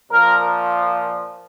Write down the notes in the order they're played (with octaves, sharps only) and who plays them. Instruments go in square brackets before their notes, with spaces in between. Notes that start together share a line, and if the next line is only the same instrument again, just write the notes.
[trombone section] A#2 F3 A#4